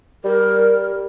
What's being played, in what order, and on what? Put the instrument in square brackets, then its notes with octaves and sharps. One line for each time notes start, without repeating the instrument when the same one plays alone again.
[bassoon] G3 [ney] A#4